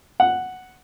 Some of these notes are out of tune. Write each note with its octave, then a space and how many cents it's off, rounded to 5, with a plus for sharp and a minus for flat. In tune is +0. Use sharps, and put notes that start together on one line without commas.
F#5 +0